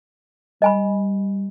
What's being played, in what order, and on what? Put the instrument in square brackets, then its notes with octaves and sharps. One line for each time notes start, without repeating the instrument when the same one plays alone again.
[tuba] G3 [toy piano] D#5 G#5 B5